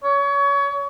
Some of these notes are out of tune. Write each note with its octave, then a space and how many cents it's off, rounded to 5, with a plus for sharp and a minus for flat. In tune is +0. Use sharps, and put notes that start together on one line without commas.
C#5 +30